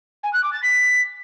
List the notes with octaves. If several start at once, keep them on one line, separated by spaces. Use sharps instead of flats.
G#5
F#6
D6
A6
B6